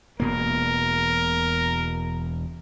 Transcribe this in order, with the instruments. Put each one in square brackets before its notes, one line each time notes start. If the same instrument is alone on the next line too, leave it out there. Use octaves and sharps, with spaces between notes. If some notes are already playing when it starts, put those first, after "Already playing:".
[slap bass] E1 B2 A#3 [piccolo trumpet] A#4